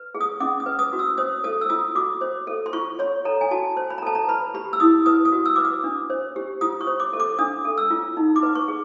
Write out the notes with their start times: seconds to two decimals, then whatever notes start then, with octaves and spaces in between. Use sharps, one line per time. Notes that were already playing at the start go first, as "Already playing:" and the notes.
Already playing: B4
0.15 G#4
0.21 D#6
0.40 C#4 D6
0.60 D#6
0.66 B4
0.79 D#6
0.93 F#4
0.99 E6
1.18 C5 D#6
1.44 A4 D#6
1.61 E6
1.70 F4 D#6
1.95 F#4 D6
2.21 C5
2.47 A4
2.66 C6
2.73 F4 C#6
2.99 C#5 C6
3.25 A4 A#5
3.41 G#5
3.51 F#4 A5
3.77 C5
3.90 B5
3.98 A#5
4.03 A4 A5
4.15 A#5
4.28 B4 B5
4.54 G4 B5
4.73 E6
4.80 E4 D#6
5.06 B4 D#6
5.25 D#6
5.32 F#4
5.46 E6
5.56 B4 D6
5.65 D#6
5.84 D4
6.10 C5
6.36 G4
6.61 F4 D#6
6.81 C#6
6.87 C5
7.00 D6
7.13 A4
7.20 D6
7.39 D4 D#6
7.65 A4
7.78 E6
7.91 F4
8.17 D#4
8.36 D6
8.43 B4
8.55 C#6
8.68 G#4